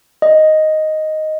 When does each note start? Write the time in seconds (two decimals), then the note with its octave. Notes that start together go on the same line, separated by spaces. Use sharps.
0.22 D#5